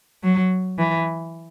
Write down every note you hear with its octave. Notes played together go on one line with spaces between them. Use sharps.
F#3
E3